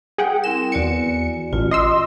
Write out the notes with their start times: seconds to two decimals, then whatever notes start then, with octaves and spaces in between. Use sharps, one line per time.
0.18 G3 G#4 F#5 G5
0.44 C4 E4 A#4 E7
0.72 E2 F#4 D5 G#5 C#7
1.53 A1 F4
1.71 D#5 C6 E6